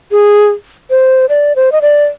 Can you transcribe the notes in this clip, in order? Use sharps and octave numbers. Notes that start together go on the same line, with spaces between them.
G#4
C5
D5
C5
D#5
D5